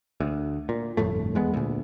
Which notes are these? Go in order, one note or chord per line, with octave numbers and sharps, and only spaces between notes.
D2
A#2
G1 F2 A2 A3
E2 G#3 B3
D2 A#2